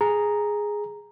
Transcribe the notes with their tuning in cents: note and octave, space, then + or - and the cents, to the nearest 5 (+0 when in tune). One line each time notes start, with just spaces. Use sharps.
G#4 +0 A#5 +0